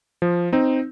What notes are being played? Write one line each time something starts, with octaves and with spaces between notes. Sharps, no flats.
F3
C4 D#4